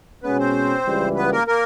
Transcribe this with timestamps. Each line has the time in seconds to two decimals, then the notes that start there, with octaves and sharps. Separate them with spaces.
0.23 B2 G#3 B3 C#4 B4
0.39 C4 C5
0.86 C#2 C#3 E3 G3
1.16 B3 B4
1.32 A#3 A#4
1.47 A#3 A#4